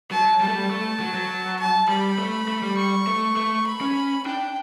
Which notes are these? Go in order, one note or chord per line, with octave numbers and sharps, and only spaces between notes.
F#3 A5
G3 A5
A3
G3
A3
F#3
F#3
A5
G3 B5
A3
A3
G3
C#6
A3
A3
B5
C#4
D4 G5